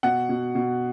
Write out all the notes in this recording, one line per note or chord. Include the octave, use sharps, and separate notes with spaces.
B2 F#5
B2
B2